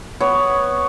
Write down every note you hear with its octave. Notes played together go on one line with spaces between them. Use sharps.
B3 C#5